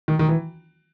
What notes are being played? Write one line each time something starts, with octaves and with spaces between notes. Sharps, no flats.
D#3
D#3
E3